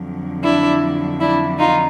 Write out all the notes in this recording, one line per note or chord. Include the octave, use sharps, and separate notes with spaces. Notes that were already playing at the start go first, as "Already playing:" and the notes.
Already playing: F2 D3 F#3
D4 E4
D4 E4
D#4 F4